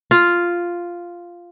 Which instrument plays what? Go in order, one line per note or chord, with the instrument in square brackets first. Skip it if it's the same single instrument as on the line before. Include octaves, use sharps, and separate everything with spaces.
[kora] F4